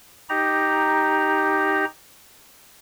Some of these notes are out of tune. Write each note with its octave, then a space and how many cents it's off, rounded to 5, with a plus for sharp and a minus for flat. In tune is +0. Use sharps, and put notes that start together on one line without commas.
D#4 +0 G4 +0 A#5 +0